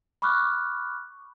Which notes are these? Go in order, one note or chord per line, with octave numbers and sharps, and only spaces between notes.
B5 C#6 D6 F6 F#6